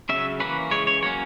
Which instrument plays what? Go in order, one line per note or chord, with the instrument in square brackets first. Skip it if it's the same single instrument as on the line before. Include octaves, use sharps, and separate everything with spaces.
[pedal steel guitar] C#3 F#3 C#4 E5
E3 A#3 C#4 B4
C#3 E3 G#3 C#5
C#5
F#3 A#3 C#4 C#5